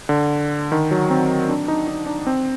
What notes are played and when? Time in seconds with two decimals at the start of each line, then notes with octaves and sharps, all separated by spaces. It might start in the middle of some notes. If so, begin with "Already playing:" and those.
0.09 D3
0.72 D#3
0.91 F#3
1.10 C4
1.49 D4
1.68 D#4
1.88 D#4
2.07 D4
2.27 C4